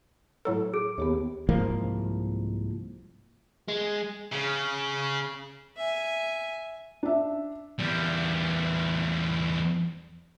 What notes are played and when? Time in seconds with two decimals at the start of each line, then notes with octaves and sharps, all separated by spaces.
0.45 A2 F#3 A4
0.74 G#4
0.98 D#2 B3 G4 C#5
1.49 C2 G#2 F3 A#3
3.68 G#3
4.33 C#3
5.77 E5 G#5
7.03 D4 E5
7.79 E2 G3